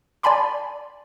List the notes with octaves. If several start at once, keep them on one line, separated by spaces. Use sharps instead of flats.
D5 G#5 A5 B5 C6 D6